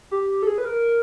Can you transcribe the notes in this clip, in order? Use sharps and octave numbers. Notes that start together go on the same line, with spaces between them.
G4
A4
G#4
B4
A#4